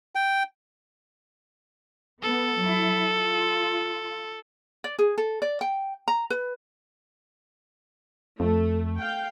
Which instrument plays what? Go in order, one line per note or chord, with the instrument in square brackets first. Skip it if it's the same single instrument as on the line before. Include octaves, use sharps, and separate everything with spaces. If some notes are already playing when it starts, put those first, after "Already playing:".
[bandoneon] G5
[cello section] B3 [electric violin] A4
[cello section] F#3 E4
F4
[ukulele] D5
G#4
A4
D5
G5
A#5
B4
[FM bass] F2 [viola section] A3
[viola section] F5 G5